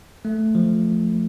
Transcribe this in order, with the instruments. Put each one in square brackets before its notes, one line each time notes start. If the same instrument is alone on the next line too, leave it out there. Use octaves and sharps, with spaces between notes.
[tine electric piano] A3
F3